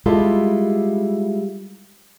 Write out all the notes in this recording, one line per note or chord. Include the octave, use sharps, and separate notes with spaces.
G3 G#3 E4 F4 A4